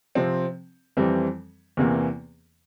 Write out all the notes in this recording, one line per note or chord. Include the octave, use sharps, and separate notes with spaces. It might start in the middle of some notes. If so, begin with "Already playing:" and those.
C3 F3 C4
F2 E3 G3 C4
E2 C3 E3 A#3